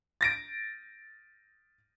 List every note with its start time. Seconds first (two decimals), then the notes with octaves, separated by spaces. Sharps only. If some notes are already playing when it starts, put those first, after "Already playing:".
0.21 A6 A#6 D7